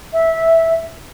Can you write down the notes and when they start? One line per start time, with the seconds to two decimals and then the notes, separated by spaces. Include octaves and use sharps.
0.13 E5